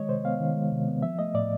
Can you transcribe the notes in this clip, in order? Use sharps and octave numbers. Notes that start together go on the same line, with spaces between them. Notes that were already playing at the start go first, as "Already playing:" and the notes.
Already playing: D#3 G#3 C#5 D#5
C3 C5
B3 F5
D#3
G#3
C3
B3
F3 E5
A3 D#5
A2 D5